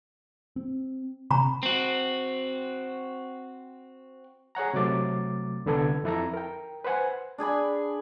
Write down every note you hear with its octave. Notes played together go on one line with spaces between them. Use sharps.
C4
C3 A#5 B5
C4 F#4
G#4 C#5 F#5 A#5
C3 F#3 A3 D6 A6
C2 D3 B3 A4 G#6
F2 E4 A4 A#5
A#4 G5
B4 C5 F#5 G#5
D4 G#4 G#5 B5